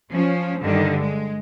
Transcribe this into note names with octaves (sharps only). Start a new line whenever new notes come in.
F3 C#4
G2 D3 D#3
G#3